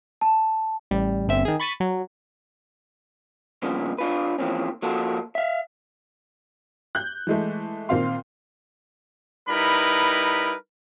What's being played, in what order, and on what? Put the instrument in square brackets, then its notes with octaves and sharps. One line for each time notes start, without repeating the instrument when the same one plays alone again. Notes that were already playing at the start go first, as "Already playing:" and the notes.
[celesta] A5
[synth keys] A1 G3
G1 C4 E5
D#3 G#4
B5 C#6 A6 B6 D#7 E7
F#3
[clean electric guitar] G2 A#2 C#3 F3 A#3 B3
D4 F4 B4
E3 F3 A#3 C4 C#4
F3 A#3 F#4 A4
E5 F5
[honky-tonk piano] F#6 G6
E3 G#3 A3
A#2 D#3 C4 F5 C6
[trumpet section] G3 D#4 E4 A#4 B4 B5